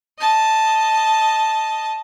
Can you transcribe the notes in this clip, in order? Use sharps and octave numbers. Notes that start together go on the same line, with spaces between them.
D#5 A5